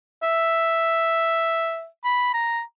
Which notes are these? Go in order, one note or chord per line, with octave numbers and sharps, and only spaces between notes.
E5
B5
A#5